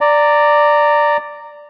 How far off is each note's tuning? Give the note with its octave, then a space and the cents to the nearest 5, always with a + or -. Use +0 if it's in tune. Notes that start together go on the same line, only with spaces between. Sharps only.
D5 +0 A#5 -15